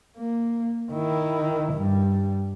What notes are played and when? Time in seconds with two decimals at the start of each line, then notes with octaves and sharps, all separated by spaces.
0.17 A#3
0.92 D#3 E4
1.73 G2 G3